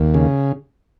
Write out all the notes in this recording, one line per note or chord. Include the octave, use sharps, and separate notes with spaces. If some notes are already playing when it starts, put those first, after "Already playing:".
Already playing: D#2
C#3